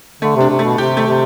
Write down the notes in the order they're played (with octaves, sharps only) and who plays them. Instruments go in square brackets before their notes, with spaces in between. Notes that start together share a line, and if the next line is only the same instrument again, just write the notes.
[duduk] D3 [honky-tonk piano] A3
[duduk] C3 [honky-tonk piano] D4
[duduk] C3
[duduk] B2 [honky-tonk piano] A3
[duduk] C3 [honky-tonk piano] G4
[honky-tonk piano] A3
[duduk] C3